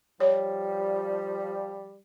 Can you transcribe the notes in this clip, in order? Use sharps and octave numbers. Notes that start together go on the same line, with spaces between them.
F3 G3 C#5